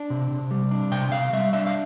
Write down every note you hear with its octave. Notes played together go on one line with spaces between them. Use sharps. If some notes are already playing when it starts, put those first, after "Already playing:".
Already playing: D4
C3
C3
G3
D4
C3 G5
C3 F5
G3 E5
D4 E5
F5